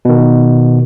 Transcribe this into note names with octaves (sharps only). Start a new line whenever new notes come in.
B2 D#3